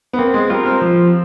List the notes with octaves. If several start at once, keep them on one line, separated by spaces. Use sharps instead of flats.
B3
A#3 C4
G#3
G3 F4 A#4
C4
F3